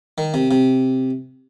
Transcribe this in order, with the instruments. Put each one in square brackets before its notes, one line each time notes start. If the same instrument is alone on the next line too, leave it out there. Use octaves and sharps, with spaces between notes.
[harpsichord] D#3
C3
C3